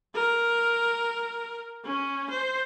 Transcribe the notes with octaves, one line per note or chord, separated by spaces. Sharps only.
A#4
C#4
C5